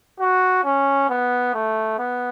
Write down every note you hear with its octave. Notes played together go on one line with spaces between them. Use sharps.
F#4
C#4
B3
A3
B3